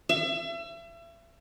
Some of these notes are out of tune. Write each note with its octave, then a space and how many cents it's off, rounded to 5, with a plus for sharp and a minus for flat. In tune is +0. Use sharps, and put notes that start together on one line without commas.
E5 +35